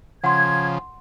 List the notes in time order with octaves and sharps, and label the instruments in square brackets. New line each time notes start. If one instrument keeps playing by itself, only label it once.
[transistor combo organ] C#3 F3 [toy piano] F#5 C6 [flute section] G#6